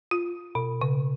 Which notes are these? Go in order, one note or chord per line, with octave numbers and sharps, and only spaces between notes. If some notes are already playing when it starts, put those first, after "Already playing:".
F4
B2
C#3